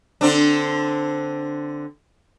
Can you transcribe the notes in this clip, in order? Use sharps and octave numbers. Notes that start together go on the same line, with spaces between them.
D3 C4 D4